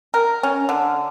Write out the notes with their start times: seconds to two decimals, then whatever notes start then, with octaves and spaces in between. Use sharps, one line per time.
0.14 A#4
0.43 C#4
0.69 D3